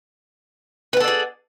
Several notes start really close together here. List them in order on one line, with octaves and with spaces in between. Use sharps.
B4 F#5 A4 D5 G#4